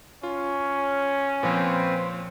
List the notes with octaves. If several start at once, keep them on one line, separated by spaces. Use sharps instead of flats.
C#4 F4
A#2 F3 C4 B4 C5